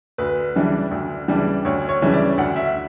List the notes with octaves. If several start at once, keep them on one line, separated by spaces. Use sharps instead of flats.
D2 B4
C#3 E3 G3 D4
D2
C#3 E3 G3 D4
D2 C#5
C#5
C#3 E3 G3 D4
E5
D5
D2 F#5
E5